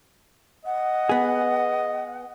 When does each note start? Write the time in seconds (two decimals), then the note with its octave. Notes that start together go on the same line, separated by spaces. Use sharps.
0.65 D#5 F#5
1.09 B3 G#4